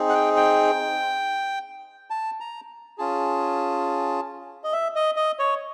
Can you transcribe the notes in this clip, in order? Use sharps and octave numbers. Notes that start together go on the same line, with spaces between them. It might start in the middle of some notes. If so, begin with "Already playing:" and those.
Already playing: C4 D#4 G#4
F#5
G5
G5
A5
A#5
C#4 F4 G#4 A5
D#5
E5
D#5
D#5
C#5